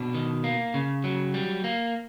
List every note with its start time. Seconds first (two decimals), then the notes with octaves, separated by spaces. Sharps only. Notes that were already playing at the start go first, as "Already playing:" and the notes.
Already playing: B2 D4
0.14 D#3
0.44 A#3
0.74 C#3
1.04 F#3
1.34 G3
1.64 A#3